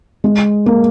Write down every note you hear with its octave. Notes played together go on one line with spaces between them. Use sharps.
G#3
A#3